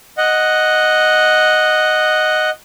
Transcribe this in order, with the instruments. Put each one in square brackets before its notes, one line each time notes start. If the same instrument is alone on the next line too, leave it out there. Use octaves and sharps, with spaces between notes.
[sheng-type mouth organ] D#5 F#5